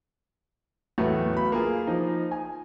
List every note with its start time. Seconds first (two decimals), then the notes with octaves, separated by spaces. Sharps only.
0.98 E2 A2 F#3 A3 B3
1.37 F5 B5
1.52 A#3 F4 G#4
1.87 F3 D#4
2.31 G#5